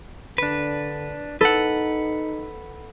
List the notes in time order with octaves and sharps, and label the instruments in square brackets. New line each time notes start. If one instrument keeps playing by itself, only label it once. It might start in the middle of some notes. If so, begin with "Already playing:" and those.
[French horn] D3 [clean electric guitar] D4 B4
[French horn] D#4 [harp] A4 [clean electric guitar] B4 F#5